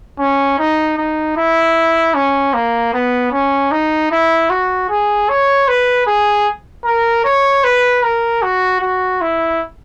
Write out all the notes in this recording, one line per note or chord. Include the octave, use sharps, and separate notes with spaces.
C#4
D#4
D#4
E4
C#4
A#3
B3
C#4
D#4
E4
F#4
G#4
C#5
B4
G#4
A#4
C#5
B4
A#4
F#4
F#4
E4